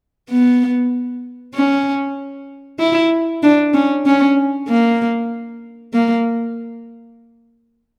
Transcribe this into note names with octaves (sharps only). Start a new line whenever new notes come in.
B3
C#4
E4
D4
C#4
C#4
A#3
A#3